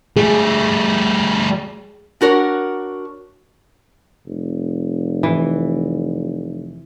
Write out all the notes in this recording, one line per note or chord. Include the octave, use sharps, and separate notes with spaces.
G3 A3 G#4
D4 F#4 A#4 C#5
F1
E3